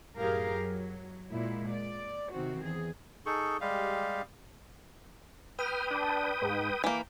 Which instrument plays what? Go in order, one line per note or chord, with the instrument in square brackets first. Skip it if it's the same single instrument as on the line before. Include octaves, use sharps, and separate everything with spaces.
[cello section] F#2 A2 G4 G#4 A#4 F5
F#3
A#2 G#3 E4
D5
C3 D#3 C4 F#4
E2 G#4
[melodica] D#4 G#4 A4 C#6
G3 G#3 G4 F5
[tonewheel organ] B4 G5 D#6 [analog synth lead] F6
[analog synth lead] D4
G#2
[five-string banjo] E3 A#3 [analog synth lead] G5